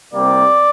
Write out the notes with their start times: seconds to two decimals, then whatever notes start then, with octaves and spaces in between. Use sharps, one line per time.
0.14 C2 C3 G3 A#3 D5